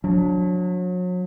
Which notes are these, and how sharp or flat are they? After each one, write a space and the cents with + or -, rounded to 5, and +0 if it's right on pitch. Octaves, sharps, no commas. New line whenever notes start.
F#3 -35 D4 -15